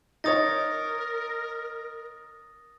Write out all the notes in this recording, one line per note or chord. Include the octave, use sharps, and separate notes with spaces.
D#4 A#4 C#5 D#6 A6 A#6